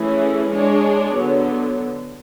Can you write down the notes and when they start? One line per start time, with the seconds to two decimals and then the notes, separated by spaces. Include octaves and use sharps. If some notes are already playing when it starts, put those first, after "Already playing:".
Already playing: E3 A3 C#4 E4 G#4
0.51 G#3 D4 G#4 C#5
1.17 D3 F#3 B3